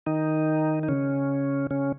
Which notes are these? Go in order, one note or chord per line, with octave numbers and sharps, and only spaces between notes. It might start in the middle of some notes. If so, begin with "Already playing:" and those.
D#3 D#4
D#4
C#3 C#4
C#3 C#4